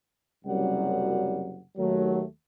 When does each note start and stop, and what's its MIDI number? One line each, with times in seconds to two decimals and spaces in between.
0.45 1.61 30
0.45 1.61 36
0.45 1.61 42
0.45 1.61 54
0.45 1.61 55
0.45 1.61 78
1.77 2.23 39
1.77 2.23 54
1.77 2.23 57